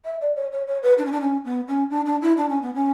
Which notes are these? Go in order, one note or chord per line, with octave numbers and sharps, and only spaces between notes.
E5
D5
C#5
C#5
C#5
B4
D4
C#4
D4
C#4
B3
C#4
D4
D4
E4
D4
C#4
B3
C#4